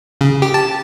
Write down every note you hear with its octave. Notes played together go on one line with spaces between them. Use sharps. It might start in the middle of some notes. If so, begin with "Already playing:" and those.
C#3
G4
A5